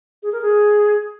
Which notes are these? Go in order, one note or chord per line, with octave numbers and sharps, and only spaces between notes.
G#4
A#4
G#4